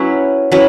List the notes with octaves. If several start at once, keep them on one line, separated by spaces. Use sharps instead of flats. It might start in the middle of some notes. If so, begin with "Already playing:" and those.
Already playing: F#3 C#4 E4 B4
F#3 C#4 E4 B4